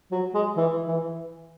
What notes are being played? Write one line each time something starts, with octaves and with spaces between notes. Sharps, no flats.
F#3
G#3
E3
E3